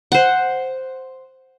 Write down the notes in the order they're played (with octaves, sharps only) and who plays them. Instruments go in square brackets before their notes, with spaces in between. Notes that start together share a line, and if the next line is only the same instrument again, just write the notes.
[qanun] C5 F#5